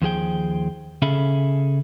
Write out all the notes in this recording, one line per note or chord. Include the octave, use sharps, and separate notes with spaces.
D#2 F3 G#4 G5
C#3 C#4 G#4 A4 E5 B5